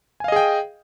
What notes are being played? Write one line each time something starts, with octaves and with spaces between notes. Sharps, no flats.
G#4 D#5 F5 G5 G#5